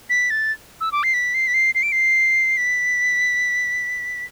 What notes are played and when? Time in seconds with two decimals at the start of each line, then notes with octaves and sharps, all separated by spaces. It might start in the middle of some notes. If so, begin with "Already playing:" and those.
0.10 B6
0.30 A6
0.81 E6
0.92 D6
1.03 C7
1.14 B6
1.34 C7
1.47 B6
1.54 C7
1.75 C7
1.83 D7
1.92 C7
2.57 B6